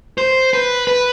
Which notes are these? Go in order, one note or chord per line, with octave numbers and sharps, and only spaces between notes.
C5
B4
B4